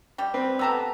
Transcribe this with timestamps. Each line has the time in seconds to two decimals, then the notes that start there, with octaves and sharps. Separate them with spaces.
0.18 G3 G4
0.34 C4 B4
0.59 B3 G4 A4 A#5 E6